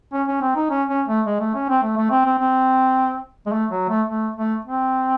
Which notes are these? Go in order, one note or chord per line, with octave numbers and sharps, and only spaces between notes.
C#4
C#4
C4
D#4
C#4
C#4
A3
G#3
A3
C#4
C4
A3
A3
C4
C4
C4
G#3
A3
F#3
A3
A3
A3
C4